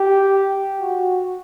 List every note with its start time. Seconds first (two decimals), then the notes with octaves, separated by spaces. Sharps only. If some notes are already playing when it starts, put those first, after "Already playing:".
Already playing: G4
0.81 F#4